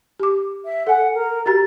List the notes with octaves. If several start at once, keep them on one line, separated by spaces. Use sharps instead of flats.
G4 D6
E5
A4 F#5 G#5
A#4
F#4 G4 A#5 A6